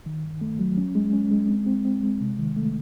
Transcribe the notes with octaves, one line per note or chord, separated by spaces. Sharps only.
D#3
G2
A3
F#3
C#4
G#3
C#4
G#3
C4
C4
C4
G#3
C3
D#3
A3